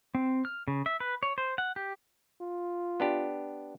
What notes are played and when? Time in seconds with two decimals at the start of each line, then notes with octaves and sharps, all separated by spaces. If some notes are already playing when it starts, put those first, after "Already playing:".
0.15 C4
0.45 F6
0.68 C#3
0.86 E5
1.00 B4
1.23 C#5
1.38 C5
1.58 F#5
1.76 G4
2.41 F4
3.00 B3 D4 G4